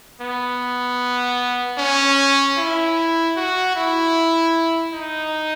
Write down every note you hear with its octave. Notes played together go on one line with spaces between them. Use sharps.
B3
C#4
E4
F#4
E4
D#4